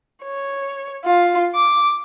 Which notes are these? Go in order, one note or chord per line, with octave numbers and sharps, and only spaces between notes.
C#5
F4
D6